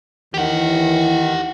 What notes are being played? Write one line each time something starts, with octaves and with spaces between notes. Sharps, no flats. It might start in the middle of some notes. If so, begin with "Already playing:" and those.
D#2 D#3 E3 G4 F#5